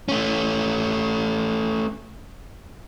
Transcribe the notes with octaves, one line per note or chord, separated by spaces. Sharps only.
A3 C#4